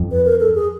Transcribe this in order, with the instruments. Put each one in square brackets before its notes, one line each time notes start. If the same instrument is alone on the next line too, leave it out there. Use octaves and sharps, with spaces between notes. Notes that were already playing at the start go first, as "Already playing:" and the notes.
Already playing: [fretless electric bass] F2
[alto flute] B4
A#4
A4
G#4